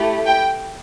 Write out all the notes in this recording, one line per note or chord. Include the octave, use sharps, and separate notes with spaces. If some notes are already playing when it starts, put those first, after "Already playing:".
Already playing: A3 E4 G4
G5